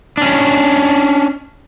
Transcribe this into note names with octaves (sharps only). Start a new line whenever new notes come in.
C#4 D4